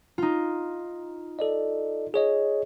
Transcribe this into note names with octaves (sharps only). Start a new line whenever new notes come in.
D#4 F4
A4 D5 D#5
G#4 C#5 D#5